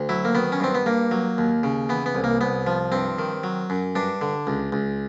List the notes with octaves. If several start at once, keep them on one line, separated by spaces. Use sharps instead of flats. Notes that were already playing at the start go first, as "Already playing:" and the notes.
Already playing: D2
F#3 E4
A#3
D#3 B3
C#4
G2 C4
B3
G2 A#3
F#3
D#2
C#3
E3 B3
B3
C2
A#3
C2 B3
F3
G2 C4
D#3
F#3
F#2
G2 D4
D3
C#2
C#2